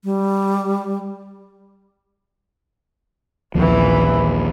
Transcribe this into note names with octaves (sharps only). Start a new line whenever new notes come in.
G3
A#1 D#2 E3 F3